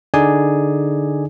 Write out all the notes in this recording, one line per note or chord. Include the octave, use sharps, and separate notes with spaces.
D3 D#4 G#4 D5 G#5